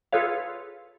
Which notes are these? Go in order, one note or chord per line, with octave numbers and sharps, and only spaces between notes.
F4 G#4 A4 B4 C#5 F5